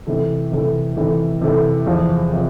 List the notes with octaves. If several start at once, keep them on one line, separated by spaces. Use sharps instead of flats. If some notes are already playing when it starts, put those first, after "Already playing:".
C3 E3 A3
C3 E3 A3
C3 E3 A3
C3 E3 A3
E2 C3 F3
C3 F3